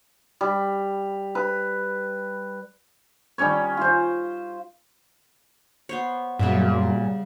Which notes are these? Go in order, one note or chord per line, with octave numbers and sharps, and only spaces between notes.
G3
B4
D#3 G3 C#4 C#5
F4 C5
B3 C5 C#5
F#2 A#2 C#3 G3 B3 E5